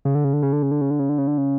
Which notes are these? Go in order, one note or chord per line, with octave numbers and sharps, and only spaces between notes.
C#3
D3
C#3
D3
C#3
D3
C#3
D3
C#3
D3
C#3
D3
C#3
D3
C#3